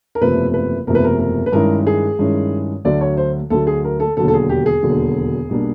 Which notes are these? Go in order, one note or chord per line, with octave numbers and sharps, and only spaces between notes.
A#4
F#1 E2 C3 F3 A3 B4
B4
F#1 E2 C3 F3 A3 A#4
B4
A#4
A#4
B4
G2 D#3 G#3 C#4 E4 A#4
G#4
G2 D#3 G#3 C#4 E4
D2 D3 F#3 D5
C#5
C5
D2 D3 F#3 A4
G#4
A#4
A4
E1 D#2 D3 F#3 A4
A4
G#4
G4
G#4
E1 D#2 D3 F#3
B1 B2 G3 A#3 D4